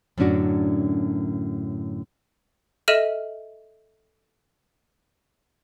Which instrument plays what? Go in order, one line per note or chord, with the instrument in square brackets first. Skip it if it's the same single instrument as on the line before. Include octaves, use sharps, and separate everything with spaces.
[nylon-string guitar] F#2 A2 D3 C#4 D4 F#4
[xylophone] A4 D#5 E5 F6 D#7 E7